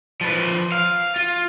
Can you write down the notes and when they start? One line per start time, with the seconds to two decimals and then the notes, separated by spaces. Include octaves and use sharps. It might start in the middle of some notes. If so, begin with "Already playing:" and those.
0.21 F3 B4
0.72 F5
1.16 F4